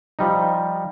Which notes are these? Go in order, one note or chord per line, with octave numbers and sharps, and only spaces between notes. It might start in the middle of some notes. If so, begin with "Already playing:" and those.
F3 G3 D#4